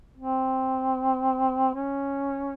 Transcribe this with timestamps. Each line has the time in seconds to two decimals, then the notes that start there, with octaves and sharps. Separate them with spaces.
0.18 C4
1.74 C#4